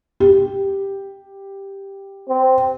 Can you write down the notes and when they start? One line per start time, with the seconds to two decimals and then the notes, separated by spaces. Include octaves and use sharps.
0.20 G4
2.29 C4